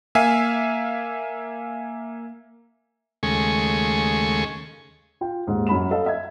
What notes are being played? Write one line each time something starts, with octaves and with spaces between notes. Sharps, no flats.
A#3 E5 F5 G#5
D#2 C#3 G#3 A3 G#5 C#6
F4 G5
D#2 G#2
F#2 B5 E7
A4 D#5 F5
E5 G#6